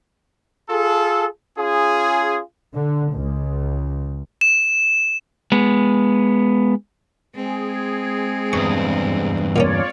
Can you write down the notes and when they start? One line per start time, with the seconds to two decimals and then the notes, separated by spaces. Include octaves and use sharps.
0.69 F4 G#4 A4
1.56 C#4 F4 G#4
2.75 D3
3.13 C#2
4.41 E7
5.52 G#3 B3
7.35 G#3 C4 G#4
8.53 E2 G2 C#6
9.56 A#2 A#3 C#4 F4 C#5 D5